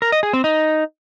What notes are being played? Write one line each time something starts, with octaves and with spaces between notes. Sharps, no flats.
A#4
D#5
G#4
C4
D#4